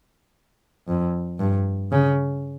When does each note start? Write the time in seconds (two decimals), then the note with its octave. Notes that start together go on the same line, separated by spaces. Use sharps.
0.88 F2
1.40 G2
1.91 C#3